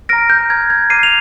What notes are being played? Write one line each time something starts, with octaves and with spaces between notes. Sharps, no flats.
A#5 F6 A#6 D7
G6
A#5 F6 G#6
G#6
A#5 D6 F6 C7 D#7
F7